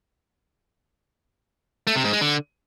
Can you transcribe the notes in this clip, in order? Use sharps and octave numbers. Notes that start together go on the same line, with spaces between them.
A3
C3
G#2
G#3
D3